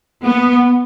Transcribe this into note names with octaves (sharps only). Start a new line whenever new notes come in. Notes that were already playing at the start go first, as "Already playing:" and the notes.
B3